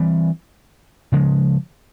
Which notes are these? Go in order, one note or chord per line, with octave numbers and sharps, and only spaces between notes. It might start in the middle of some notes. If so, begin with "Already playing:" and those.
Already playing: E3 G3 C4
C#3 F3 G#3